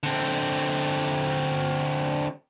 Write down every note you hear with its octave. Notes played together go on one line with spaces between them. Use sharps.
D3 C4